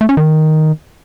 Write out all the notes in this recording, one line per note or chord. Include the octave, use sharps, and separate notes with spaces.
A3
C#4
D#3